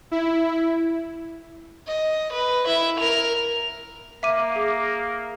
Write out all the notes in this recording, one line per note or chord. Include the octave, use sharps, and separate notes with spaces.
E4
D#5
B4
E4 E5
A#4 F7
A#3 E5 D6 D#7
G#4